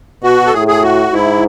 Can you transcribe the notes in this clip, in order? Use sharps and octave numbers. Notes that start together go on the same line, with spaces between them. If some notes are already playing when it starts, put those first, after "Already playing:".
B2 F#4
A4
A2 G#4
G#4
F#4
G#2 E4